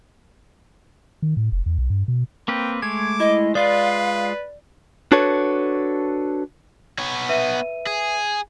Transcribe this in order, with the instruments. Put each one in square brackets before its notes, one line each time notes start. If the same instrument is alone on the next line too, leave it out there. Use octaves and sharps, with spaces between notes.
[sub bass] D#3
A2
F1
E2
B1
G2
B2
[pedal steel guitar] A#3 C4 B4 [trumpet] G5
[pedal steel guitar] G#3 A3 [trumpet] D6 [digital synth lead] G#6
[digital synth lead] E4 [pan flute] D#5
[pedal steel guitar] G#3 F4 [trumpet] B4 [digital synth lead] D5 [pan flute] F5
[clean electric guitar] D4 F#4 A4 B4 C#5
[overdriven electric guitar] B3 C#5
[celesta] B4 E5 D#7
[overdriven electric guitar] G#4